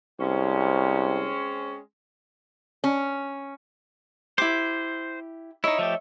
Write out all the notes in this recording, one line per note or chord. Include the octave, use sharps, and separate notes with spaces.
C2 G#3 C4 C#4
C#4
E4 G4 C5 D6
D#4 E4 C#5 D#5 E5
F3 A3 G4